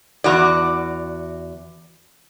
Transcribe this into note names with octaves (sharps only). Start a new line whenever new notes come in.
E2 F#4 D5